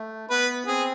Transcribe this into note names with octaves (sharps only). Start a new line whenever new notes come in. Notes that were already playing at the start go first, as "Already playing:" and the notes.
Already playing: A3
B3 B4
C4 G#4